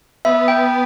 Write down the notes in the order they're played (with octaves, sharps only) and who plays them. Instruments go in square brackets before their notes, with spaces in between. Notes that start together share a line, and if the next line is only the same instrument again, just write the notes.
[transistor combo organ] B3 [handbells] E5
[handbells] G5